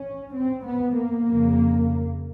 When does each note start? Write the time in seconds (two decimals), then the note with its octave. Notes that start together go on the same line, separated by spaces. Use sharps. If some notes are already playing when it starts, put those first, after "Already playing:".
Already playing: C#4
0.35 C4
0.65 B3
0.95 A#3
1.25 F2 C#3